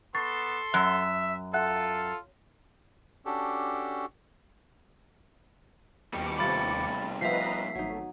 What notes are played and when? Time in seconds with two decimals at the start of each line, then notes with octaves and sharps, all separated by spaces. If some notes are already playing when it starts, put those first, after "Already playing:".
0.15 B3 A4 C6 C#6 A6 C7
0.74 F#2 E5 F#6
1.54 F4 A4 E5 F#5 F#6
3.25 C#4 D4 F#4 G4 A4
6.14 D#2 B2 G3 D6 C#7
6.39 C3 A3 F4 B5 A6
7.21 F3 B3 B4 D#5 E5 A#5 B6 C7
7.75 G#1 F#3 A3 D#4